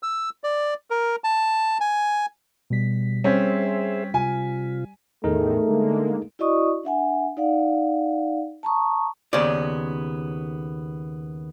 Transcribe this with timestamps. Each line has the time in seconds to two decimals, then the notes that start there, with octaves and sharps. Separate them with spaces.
0.03 E6
0.44 D5
0.90 A#4
1.24 A5
1.80 G#5
2.70 B2 G3 B6
3.24 G3 C4 C#4 G#4 C5 E5 B6
4.14 C3 F4 G#5
5.24 E2 A2 D#3 A3 D#4 G#4 A#4
5.67 D3 G#3 A#3
6.39 E4 F#4 D5 D#5 C#6 D#6
6.84 D4 E5 F#5 G#5
7.37 D#4 D5 F5 F#5
8.63 A5 A#5 C#6 D#6
9.33 D#2 C#3 B3 C#4 C5 D5